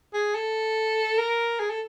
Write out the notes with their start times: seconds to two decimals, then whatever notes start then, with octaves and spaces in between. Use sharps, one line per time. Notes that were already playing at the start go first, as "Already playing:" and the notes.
0.14 G#4
0.35 A4
1.18 A#4
1.60 G#4
1.70 A4